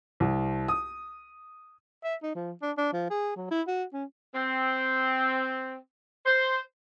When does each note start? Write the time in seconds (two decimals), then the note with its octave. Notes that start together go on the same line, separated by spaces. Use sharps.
0.20 C2
0.68 D#6
2.04 E5
2.23 D#4
2.35 F3
2.62 D4
2.77 D4
2.93 F3
3.10 G#4
3.36 F#3
3.51 E4
3.68 F#4
3.93 C#4
4.34 C4
6.25 C5